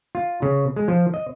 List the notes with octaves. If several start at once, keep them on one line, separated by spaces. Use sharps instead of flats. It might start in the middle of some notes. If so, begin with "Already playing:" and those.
F4
C#3
G#3
F3
D#5